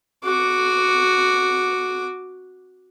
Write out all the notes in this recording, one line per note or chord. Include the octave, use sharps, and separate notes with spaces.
F#4 D6